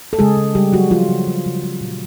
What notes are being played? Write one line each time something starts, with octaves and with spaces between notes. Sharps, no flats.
A4
C#3 G#3 G#4
C#3
C#3 G3 G4
C#3 F#3 F#4
F3 F4
C#3
C#3
C#3
F3
A#2